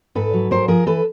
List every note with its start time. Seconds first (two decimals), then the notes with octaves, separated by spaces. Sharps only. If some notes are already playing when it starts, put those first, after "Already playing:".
0.15 G#2 A4 B4
0.33 F#3
0.51 G#2 A#4 C5
0.68 F3 G#4 A#4
0.86 E3 A4 B4